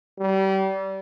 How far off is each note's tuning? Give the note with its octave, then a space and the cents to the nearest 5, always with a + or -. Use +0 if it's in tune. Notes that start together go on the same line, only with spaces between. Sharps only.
G3 -30